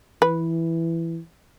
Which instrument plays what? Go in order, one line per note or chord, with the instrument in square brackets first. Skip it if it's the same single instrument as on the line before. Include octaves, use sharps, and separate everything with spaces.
[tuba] E3 [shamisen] B4